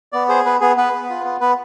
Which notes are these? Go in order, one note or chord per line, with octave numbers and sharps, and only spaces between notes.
B3 D5
G#4 C5
B3 B4
B3 G#4
B3 B4
B3
F4
B3
B3 B4